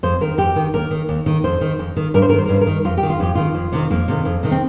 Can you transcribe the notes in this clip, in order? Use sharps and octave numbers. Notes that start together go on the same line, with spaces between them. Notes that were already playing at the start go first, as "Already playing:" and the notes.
F2 C5
D#3 A#4
F2 G4
D#3
D#2 A#4
D#3
D#2
D#3
F2 C5
D#3
F2
D#3
G2 A#4
C5
D#3 A#4
C5
A#4
G2
C5
A#4
D#3
F2 F4
G4
D#3
F4
F2 G4
D#3 F4
F2
C3 D#3
F2 A#3
C3 D#3
F2
C3 D#3
C4